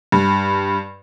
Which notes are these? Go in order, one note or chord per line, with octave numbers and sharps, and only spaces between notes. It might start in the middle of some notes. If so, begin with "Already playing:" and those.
G2